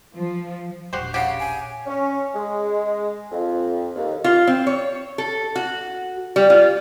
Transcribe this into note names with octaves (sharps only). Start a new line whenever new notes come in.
F3
E1 A#1 F#4 G4 C5
C#3 G4 F#5
G#5
C#4
G#3
F2
D#2
F4
C4
C#5
A4
F#4
G3
F4